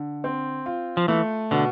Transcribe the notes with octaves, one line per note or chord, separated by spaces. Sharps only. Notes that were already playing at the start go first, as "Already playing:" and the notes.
Already playing: D3
C4
F4
F3
E3 A3
B2 D3